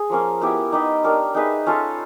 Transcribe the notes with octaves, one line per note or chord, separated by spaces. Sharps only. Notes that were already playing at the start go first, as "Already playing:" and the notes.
Already playing: G#4
F3 A#3 C#4
B3 E4 G4
D#4 G4 B4 D#5
D4 G4 A#4 C#5
D#4 G#4 B4 E5
C#4 F4 A4